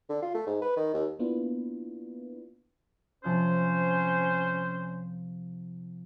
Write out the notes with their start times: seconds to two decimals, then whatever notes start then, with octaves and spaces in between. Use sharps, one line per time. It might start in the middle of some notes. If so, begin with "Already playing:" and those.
0.09 D3
0.22 F4
0.35 A3
0.47 G#2
0.62 B4
0.77 D#3
0.94 D#2
1.19 A#3 B3 D4 E4 F4 B4
3.24 C3 F3 C#4 C5 F#6